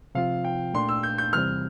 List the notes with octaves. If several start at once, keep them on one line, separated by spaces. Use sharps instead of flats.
C3 F3 C4 F4 F5
G5
A#2 A3 D4 C6
E6
G6
G6
E2 C3 E3 G3 C4 F6